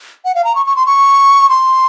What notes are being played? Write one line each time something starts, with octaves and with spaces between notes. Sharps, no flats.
F#5
F5
A#5
C#6
C#6
C6
C#6
C6